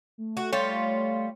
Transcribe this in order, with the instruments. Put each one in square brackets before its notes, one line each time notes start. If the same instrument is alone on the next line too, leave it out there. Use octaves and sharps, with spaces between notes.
[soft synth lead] A3
[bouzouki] F#4
[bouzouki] G3 F4 [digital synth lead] C#5